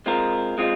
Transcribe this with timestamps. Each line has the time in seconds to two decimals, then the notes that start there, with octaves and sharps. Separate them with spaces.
0.06 G#3 C4 F4 A#4
0.58 G#3 C4 F4